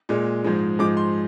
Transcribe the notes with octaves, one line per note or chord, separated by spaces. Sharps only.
A#2 G#3
G#2 F3 G#3
G#2 F3 G#3 D6
C6